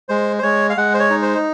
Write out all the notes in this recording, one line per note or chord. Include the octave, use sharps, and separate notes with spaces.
G#3 C5
C5
G#3 C#5
F5
G#3 F#5
C5
C#5
D#4
C5